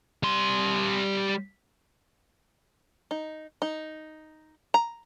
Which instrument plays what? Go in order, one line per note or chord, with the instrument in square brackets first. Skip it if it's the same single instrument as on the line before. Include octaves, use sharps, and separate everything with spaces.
[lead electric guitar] G3 C6
[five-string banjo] D#4
D#4
A#5